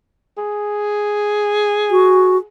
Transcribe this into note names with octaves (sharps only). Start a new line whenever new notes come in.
G#4
F#4